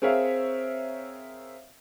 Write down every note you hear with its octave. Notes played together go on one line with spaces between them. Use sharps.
C4 G#4 A#4 C#5 E5 F5